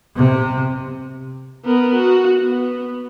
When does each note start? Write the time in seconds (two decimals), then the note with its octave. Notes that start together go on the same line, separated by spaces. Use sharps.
0.16 C3
1.65 B3 A#4
1.96 F#4
2.43 B3